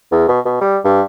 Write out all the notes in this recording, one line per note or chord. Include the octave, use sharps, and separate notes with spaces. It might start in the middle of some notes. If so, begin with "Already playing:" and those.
E2
B2
B2
G3
G2